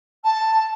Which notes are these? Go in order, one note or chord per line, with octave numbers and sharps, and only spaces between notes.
A5